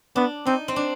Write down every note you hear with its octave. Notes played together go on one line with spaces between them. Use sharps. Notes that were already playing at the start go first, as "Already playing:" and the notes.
B3 D4
C4 D#4
C4
D4